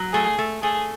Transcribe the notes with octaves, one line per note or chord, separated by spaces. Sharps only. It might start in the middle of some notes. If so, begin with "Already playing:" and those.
Already playing: F#3
A3 G#4
A3
A3 G#4